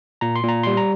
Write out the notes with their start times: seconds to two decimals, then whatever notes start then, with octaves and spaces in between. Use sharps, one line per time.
0.21 A#2 A#5
0.36 C6
0.44 A#2 A#5
0.63 G3 C6
0.77 A#5